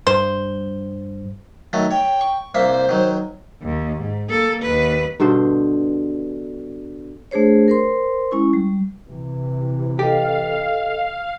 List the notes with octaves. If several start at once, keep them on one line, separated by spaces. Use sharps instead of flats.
G2 C5
D#3 F#3 A3
C#5 G5
C#6
C2 A#3 C5 E5
D#3 F#3
D#2
G#2
A#3 A4
D#2 B4
G2 B2 D3 C5
A3 D4 G#4 C5 C#5
A#4 C5 C6
G#3 C#4 E4 C#6
G3
C3 E3
G4 A4 D#5 F5